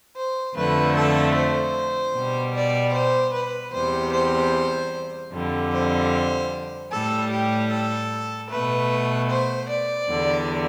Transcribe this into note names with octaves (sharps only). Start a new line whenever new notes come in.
C5
F2 D3 F3 A3 B4
A4
C5
B2 G3
D5
C5
B4
E2 C3 G3 C5
C5
F2 D3 G3
C5
A2 G3 A4
G4
A4
B2 A3 B4
C5
D5
E2 D3 G3